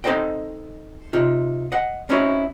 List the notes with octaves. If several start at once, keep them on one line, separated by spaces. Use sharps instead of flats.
C4 D#4 A4 C5 D#5 G5
C3 D#4 F4
D#5 F#5
C4 C#4 D#4 E4 F#4 C#5